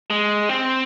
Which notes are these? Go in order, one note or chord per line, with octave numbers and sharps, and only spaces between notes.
G#3
C4